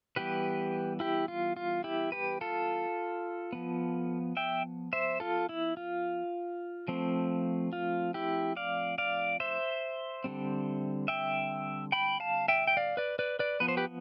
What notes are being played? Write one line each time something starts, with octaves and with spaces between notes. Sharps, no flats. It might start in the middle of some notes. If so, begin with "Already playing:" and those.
E3 G3 B3 G4 B4
E4 G4
F4
F4
E4 G4
G4 B4
F4 A4
F3 B3
E5 G5
C5 E5
F4 A4
E4
F4
F3 A3 C4
F4
E4 G4
D5 F5
D5 F5
C5 E5
D3 G3 C4
E5 G5
G5 B5
F5 A5
E5 G5
G5
D5 F5
B4 D5
B4 D5
B4 D5
F3 B3 B4
C5
G4 B4